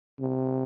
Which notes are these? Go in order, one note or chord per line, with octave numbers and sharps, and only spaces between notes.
C3